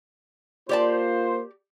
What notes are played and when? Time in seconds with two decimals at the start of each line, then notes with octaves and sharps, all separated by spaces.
0.69 A#3 F4 G4 C5 D5 A5